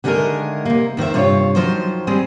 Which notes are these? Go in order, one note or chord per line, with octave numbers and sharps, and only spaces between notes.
D3 D#3 G#3 A3 G#4 A#4
C3 A#3
F2 D#3 C5 E5
G2 C3 F4 C#5
D#3 F3 F#3 C5
G3 G#3 C4 G#4